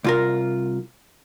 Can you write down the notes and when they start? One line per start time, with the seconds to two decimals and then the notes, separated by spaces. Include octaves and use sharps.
0.04 C2 F4 A#4